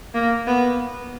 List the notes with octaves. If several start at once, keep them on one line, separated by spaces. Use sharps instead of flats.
A#3
B3